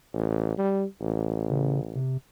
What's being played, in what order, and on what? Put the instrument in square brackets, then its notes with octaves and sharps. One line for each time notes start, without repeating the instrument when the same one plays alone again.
[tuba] A1
G3
A1
[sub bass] C#3
C3